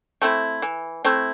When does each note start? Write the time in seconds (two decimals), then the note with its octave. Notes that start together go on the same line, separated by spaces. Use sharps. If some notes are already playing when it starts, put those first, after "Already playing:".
0.22 A3 C4 E4
0.62 E3
1.05 A3 C4 E4